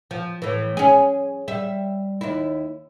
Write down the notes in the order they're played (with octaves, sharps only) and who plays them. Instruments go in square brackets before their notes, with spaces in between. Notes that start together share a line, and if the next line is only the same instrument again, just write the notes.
[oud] F3
A2 E3
C#4 G#4
G3 E5
D#2 E4